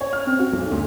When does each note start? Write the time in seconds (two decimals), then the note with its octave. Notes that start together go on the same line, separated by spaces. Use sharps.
0.01 C#5
0.13 F6
0.26 C4
0.39 F#4
0.52 B1
0.71 D2